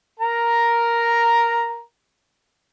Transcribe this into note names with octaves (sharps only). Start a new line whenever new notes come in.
A#4 A#5